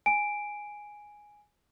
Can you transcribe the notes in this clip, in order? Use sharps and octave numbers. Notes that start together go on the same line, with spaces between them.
G#5 D7